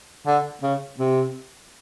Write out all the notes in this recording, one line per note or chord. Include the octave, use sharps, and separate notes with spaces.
D3
C#3
C3